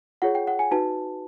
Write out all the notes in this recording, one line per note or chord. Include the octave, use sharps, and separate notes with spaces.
F4 G#4 C#5 F#5
G5
F#5
G#5
D#4 F#4 B4 A5